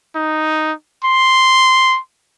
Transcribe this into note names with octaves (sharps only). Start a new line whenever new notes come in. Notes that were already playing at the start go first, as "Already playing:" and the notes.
D#4
C6